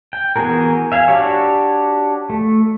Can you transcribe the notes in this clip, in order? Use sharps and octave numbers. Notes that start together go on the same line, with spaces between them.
G5
E3 B3 F#4 G#4 A#4
E5 F5 G#5
D4 F#4 G4 C#5
A3